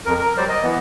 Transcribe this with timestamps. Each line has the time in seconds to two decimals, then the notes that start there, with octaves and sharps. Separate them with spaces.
0.06 F2 A#4
0.19 A#4
0.37 F#3 G3 C5 D5
0.49 D#5
0.62 E3 B3